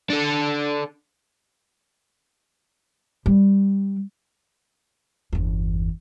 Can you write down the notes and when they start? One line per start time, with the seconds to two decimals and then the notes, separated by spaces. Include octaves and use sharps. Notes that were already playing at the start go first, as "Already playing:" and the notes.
0.10 D4 A4
3.26 G3
5.33 G1 E2